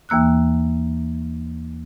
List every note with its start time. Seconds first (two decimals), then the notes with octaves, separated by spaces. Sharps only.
0.09 D#2 E3 A#3 E6 F#6